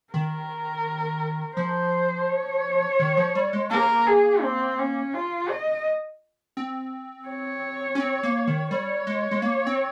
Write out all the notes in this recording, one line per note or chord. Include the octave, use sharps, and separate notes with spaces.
D#3 A#4
F3 C5
C#5
D#3
F3
G3
G#3
A#3 A#4
G#4
C4
C#4
F4
D#5
C4
C#5
C#4
C4
A#3
D#3
G3 C#5
G#3
G#3
A#3
C4